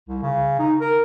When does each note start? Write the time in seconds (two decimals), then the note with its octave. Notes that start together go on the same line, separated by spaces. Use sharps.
0.08 C2
0.22 C#3
0.59 D#4
0.80 A#4